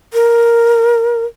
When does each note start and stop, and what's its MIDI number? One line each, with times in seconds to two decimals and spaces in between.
0.14 1.25 70